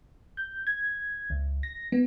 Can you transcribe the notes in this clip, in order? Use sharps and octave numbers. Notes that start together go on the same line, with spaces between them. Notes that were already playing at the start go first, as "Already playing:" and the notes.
G6
G#6
C#2
A#6
B3